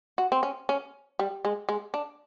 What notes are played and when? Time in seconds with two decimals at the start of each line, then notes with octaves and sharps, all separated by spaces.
0.18 F#4
0.32 C4
0.43 C#4
0.69 C#4
1.19 G3
1.45 G#3
1.69 G#3
1.94 D4